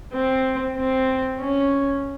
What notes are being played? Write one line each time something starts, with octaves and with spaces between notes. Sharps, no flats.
C4
C4
C#4